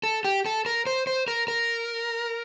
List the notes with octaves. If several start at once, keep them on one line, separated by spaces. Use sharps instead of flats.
A4
G4
A4
A#4
C5
C5
A#4
A#4